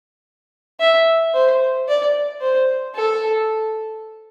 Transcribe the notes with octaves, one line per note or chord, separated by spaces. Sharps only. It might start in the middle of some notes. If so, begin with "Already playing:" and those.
E5
C5
D5
C5
A4